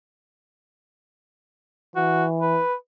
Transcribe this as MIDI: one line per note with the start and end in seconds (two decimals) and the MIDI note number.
1.96 2.60 52
1.96 2.25 66
2.41 2.74 71